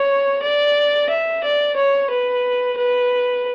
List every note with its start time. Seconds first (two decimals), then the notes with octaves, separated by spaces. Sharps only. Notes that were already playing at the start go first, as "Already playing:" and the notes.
Already playing: C#5
0.42 D5
1.09 E5
1.43 D5
1.76 C#5
2.10 B4
2.77 B4